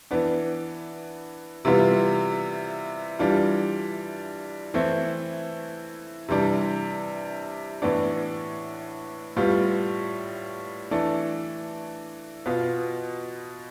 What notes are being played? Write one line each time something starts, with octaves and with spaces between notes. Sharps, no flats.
E3 B3 D4
C3 E3 G3 B3 F4
E3 G3 D4 F4
E3 A3 C4 E4
C3 E3 G3 D4
A2 E3 B3 D4
A2 G3 B3 F4
E3 A3 D4
B2 B3 F4